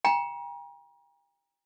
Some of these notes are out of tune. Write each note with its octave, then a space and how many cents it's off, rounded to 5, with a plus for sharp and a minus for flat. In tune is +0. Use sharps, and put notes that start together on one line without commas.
G5 +40 A#5 +35